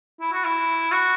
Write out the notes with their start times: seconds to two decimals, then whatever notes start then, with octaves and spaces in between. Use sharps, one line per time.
0.20 E4
0.33 F#4
0.44 E4
0.92 F#4